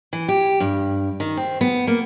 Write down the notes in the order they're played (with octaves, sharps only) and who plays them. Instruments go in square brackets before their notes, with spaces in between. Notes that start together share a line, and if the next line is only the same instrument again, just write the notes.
[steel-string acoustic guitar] E3
G4
G2
D#3
C4
B3
A#3